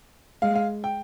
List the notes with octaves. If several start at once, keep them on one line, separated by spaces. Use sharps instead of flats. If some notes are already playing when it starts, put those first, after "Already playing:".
G#3 F5
F5
G5